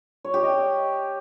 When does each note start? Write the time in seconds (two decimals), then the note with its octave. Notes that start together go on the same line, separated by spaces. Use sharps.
0.24 C#5
0.34 G4
0.43 D#5